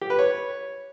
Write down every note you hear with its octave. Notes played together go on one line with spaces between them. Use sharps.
G4
B4
C#5